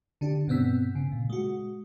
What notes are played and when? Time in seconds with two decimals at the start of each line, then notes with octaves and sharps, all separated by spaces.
0.21 D3 D4 G4
0.47 G2 B2 B3 C4 E6 B6
0.95 C#3
1.12 A#2
1.30 G#3 F#4